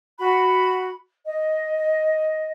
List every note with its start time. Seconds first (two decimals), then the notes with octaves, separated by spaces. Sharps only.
0.19 F#4 B5
1.25 D#5